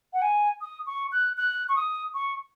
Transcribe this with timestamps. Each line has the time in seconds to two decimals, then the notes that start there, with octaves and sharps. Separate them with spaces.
0.13 F#5
0.22 G#5
0.61 D#6
0.87 C#6
1.12 F#6
1.37 F#6
1.69 C#6
1.76 D#6
2.14 C#6